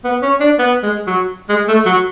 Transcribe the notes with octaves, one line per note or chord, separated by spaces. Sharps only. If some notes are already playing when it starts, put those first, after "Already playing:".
B3
C#4
D4
B3
G#3
F#3
G#3
A3
F#3